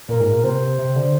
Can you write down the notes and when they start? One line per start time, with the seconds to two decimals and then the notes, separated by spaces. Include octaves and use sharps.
0.09 A#2 A#4
0.20 G#2
0.32 A#2
0.44 C3 C5
0.79 C3
0.96 D3